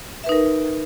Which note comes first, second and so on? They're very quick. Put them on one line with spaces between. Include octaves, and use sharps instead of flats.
E5 B4 D#4 A#4